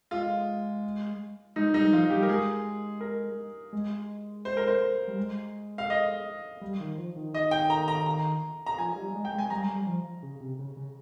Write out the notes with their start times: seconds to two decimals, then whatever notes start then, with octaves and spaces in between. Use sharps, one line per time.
0.11 G#3 F4
1.56 G#3 D#4
1.74 G3 D#4
1.92 F3 F4
2.10 G3 G4
2.23 A#4
2.28 G#3 G#4
3.01 A#4
3.73 G#3
4.45 C5
4.57 A#4
4.67 C5
5.08 G3
5.17 G#3
5.78 F5
5.90 D#5
6.61 G3
6.80 D#3
6.98 F3
7.16 D#3
7.33 D#3 D#5
7.51 G5
7.70 A#5
7.88 A#5
8.06 A#5
8.66 A#5
8.78 F3 G#5
8.96 G3
9.15 G#3
9.25 G5
9.33 G#3
9.38 G#5
9.50 G3 A#5
9.69 G3
9.87 F3
10.23 C#3
10.41 C3
10.59 C#3
10.77 C#3